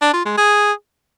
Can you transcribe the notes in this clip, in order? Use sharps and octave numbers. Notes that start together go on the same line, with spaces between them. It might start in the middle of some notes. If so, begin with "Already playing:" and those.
D4
F4
G#3
G#4